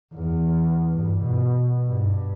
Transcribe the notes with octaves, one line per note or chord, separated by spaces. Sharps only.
E2
G2
B2
G2